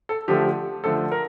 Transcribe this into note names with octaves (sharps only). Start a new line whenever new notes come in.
A4
D3 F3 A3 G4
D3 F3 A3 A4
A#4